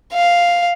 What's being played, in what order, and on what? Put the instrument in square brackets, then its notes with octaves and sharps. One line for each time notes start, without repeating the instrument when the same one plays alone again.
[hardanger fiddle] F5